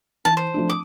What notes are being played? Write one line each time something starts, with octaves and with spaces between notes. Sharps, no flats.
E3 A5
C5
F3 A3 D4
D6 D#6